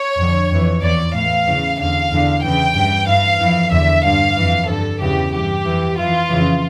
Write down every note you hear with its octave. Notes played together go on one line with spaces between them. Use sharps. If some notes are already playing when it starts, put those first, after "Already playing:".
Already playing: C#5
F2 D3
F2 E3
E2 E3 D5
A2 E3 F5
E2 C#3 E3
E2 D3 F5
E2 D3
E2 C#3 E3 G5
G2 E3
G2 E3 F5
F2 E3
E2 D3 E5
G2 D3 F5
F2 E3
G2 D3 A4
E2 C#3 E3 G4
G2 E3 G4
F2 E3
F2 E3 F4
F2 C#3 E3